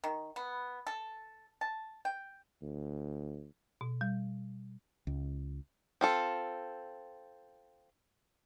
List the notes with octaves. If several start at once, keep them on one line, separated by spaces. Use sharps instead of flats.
D#3
B3
A4
A5
G5
D2
B2
G3
C#2
C4 F4 A4